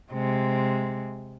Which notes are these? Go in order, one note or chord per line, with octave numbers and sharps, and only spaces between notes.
C3 G#3